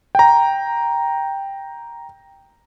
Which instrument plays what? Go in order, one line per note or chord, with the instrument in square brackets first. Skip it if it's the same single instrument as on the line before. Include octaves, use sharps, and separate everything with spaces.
[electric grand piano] G5 A#5